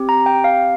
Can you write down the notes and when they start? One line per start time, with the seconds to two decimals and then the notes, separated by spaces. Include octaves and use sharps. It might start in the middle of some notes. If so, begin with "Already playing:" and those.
Already playing: C4 G4
0.09 A#5
0.26 G5
0.44 F5